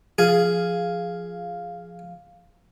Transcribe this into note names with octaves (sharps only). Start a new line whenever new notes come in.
F3 G#4 F5